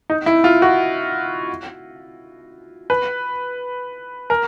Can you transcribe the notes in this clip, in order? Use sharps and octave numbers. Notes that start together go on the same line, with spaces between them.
D#4
E4
F4
F#4
B4
A#4